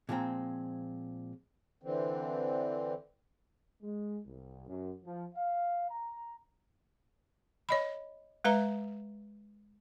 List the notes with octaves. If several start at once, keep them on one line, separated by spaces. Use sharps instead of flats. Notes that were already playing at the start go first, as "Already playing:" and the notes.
A#2 F3 G#3 C4 A#5
D3 E3 C4
G#3
C2
F#2
F3
F5
A#5
C#5 D#5 B5
G#3 B4 E5 A#5